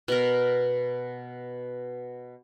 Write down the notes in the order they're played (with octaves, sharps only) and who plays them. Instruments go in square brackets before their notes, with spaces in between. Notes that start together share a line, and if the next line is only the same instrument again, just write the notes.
[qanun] B2 A#4